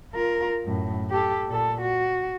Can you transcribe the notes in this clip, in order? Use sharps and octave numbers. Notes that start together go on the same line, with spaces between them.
F4 A#4
F#2 A2
G4 A4
A#2 A4
F#4